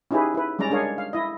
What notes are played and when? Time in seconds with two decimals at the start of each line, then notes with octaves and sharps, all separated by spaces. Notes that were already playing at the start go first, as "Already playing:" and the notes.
0.11 C#4 D#4 E4 G4 G#4 B4
0.35 E4 B4
0.59 G3 G#3 C#4 D5 A#5
0.70 G#3 D4 G#4 A#4 C#5 F5
0.98 F5
1.13 E4 D#5